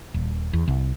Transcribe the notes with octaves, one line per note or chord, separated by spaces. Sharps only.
D#1
E2
C2